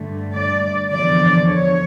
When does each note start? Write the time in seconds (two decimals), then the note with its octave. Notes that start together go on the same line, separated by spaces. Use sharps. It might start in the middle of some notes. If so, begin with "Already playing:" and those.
Already playing: G2 D3 A3
0.35 D5
0.90 E2 D3 F3 D5
1.44 C#5